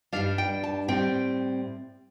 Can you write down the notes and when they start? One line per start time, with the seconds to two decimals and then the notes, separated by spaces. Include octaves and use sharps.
0.13 G2 G3 D4 F5
0.38 G5
0.64 A5
0.88 A2 G3 C4 G5